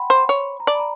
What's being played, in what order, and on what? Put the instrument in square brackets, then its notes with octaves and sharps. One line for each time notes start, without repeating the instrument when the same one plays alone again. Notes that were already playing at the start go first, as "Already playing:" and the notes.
Already playing: [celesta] F#5 G5 B5 C6
[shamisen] C5
C#5
[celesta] A#5
[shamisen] D5 [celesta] A5
[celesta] B5
A#5